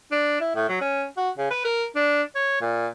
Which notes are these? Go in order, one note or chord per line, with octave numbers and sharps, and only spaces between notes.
D4
E4
A2
F#3
C#4
F#4
C#3
B4
A#4
D4
C#5
A#2